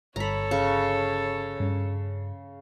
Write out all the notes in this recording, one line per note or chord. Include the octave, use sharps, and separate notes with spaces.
G1 A4 C#5 A#5 B5
C#3
G2 C#4